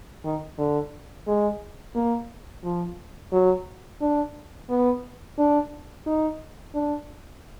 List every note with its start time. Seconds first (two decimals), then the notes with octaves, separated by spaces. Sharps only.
0.24 D#3
0.58 D3
1.27 G#3
1.95 A#3
2.64 F3
3.32 F#3
4.01 D4
4.69 B3
5.38 D4
6.06 D#4
6.74 D4